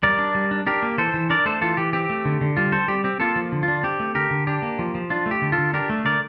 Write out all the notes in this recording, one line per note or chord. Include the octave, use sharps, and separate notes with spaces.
G3 A#4 D5
D4
G3
D4
D4 G4 A#4
A#3
E3 A4 C5
E3
D4 A#4 D5
A3 A4 C5
E3 F4 A4
E3 G4
C4 G4
A3
D3
D3
G3 F4
C4 A4 C5
G3 G4
C4 G4
A#3 F4 A4
F3
D3
F4
D4
C4 G4
A3
D3 G4 A#4
D3
D4 G4
A#3
F3
F3
D4 F4
A3
G4
D3
F4 A4
D3
D4 G4 A#4
A3
D3 A#4 D5